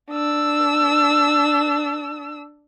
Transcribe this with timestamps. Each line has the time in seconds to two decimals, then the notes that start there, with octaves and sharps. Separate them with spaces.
0.11 D4 E6